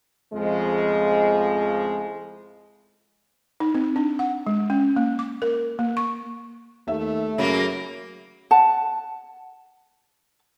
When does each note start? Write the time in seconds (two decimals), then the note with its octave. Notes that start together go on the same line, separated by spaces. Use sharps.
0.33 F2 A2 C#3 F3 G#3
3.60 D#4
3.75 C4
3.96 D4
4.19 F#5
4.47 G#3
4.70 C#4
4.96 A#3
5.19 D6
5.42 A#4
5.79 A#3
5.97 C#6
6.88 D#2 A3 E5
7.38 F#2 C#3 F#3 A#3
8.51 F#5 A5